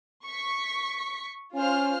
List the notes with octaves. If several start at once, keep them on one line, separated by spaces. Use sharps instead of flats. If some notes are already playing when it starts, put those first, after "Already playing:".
C#6 B6
C#4 F4 C5 F6